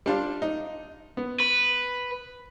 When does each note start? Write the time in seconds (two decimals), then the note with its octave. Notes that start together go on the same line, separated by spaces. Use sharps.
0.06 G3 D4 F4
0.42 D#4
1.17 B3
1.40 B4